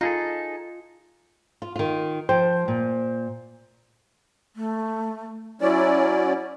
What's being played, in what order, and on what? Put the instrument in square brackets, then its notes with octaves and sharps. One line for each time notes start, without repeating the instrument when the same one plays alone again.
[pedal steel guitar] D#4 G#4 A4 [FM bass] F4
[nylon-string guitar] F4
D#3 F4
[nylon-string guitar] F3 G5 [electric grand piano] C5
[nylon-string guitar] A#2
[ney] A3
[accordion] F#3 C#4 D5 [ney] E4